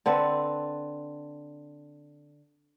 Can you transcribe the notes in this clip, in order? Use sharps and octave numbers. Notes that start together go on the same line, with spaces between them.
D3 C4 A4 B4